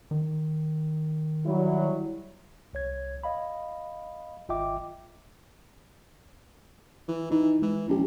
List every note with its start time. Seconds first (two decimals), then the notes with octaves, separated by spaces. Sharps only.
0.11 D#3
1.46 F#3 G3 E4
2.73 C2 C#5 G#6
3.23 D#5 F5 B5
4.49 G#1 F4 D#5 E5 G5 D6
7.08 E3
7.31 E3 D#4
7.62 E3 G#3
7.89 A#1 C#4 G4